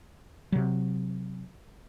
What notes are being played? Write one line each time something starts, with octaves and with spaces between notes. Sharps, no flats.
C3 F#3